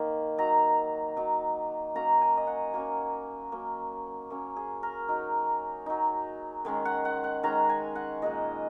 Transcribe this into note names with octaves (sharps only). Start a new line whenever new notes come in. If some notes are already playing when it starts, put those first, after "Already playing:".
Already playing: D#3 A#3 D#4
F#3 D#4 A#5
F#3 D#4
F#3 A#3 C#4 A#5
G#5
D#5
F#5
F#3 A#3 C#4 G#5
F#3 A#3 C#4
F#3 A#3 C#4
G#4
A#4
F#3 D#4
F#3 D#4
D#3 G#3 C#4
F#5
F#5
F#5
D#3 G#3 C#4 A#5
G#5
F#5
A#2 G#3 D#4 D#5